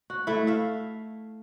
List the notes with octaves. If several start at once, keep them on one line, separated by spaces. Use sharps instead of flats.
F#4
A3 E4
E5 F5